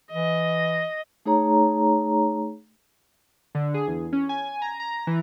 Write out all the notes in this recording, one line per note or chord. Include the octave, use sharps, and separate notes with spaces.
E3 D#5
A3 D#4 G#4 C#5 A#5
D3
G#4
E2
C#4
G#5
A#5
A#5
E3